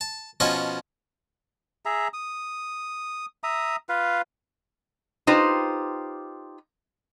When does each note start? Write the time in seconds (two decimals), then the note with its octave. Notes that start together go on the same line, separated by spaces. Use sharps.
0.01 A5
0.40 B2 F3 C#4 C#5 D#5 A5
1.85 G#4 E5 A#5
2.13 D#6
3.44 E5 A#5 D#6
3.89 F4 B4 F5
5.27 D#4 F4 G4 B4 C5